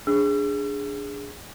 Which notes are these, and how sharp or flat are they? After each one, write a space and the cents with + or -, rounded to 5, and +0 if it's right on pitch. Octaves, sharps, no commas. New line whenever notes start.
D4 -10 G#4 -5 E6 +45